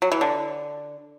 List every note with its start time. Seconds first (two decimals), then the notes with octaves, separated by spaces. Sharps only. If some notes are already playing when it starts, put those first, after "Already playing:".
0.02 F#3
0.12 E3
0.21 D3